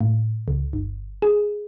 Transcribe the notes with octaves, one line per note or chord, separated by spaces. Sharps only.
A2
C#2
G1
G#4